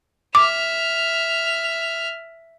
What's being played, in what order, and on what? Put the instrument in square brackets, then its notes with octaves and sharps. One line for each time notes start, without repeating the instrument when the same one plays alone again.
[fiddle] E5 F6 [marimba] D6